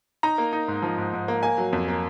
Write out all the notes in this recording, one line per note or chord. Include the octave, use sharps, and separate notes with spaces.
D#4 A#5
A#3
D#4
G#2
F3
G#2
G#2
A#3
A#3 G#5
F#3
F2
A#3